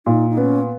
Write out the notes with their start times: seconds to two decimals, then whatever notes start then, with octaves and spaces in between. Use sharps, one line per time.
0.06 A#2 D#4
0.30 D#4
0.37 B3 C#4